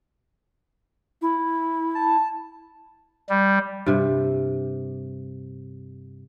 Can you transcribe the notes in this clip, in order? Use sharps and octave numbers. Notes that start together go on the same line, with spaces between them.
E4
A5
G3
G2 C3